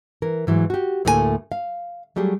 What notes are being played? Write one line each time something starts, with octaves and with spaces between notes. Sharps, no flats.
E3 A#4
G#2 E3 F#3
F#4 G4
D2 A2 A3 A#3 A4 G#5
F5
F#3 G3 A3 G4 G#4